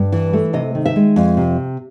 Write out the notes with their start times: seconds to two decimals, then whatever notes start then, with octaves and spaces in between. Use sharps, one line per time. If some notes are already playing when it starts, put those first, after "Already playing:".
Already playing: G2
0.12 E3
0.33 A3
0.53 C3 D#5
0.75 D#3
0.86 E5
0.96 G#3
1.16 F2
1.37 C3